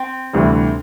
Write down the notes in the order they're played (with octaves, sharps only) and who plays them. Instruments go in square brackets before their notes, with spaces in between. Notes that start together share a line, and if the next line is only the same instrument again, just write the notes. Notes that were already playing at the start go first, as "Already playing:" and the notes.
Already playing: [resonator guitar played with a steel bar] C4
[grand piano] D2 C3 E3 G3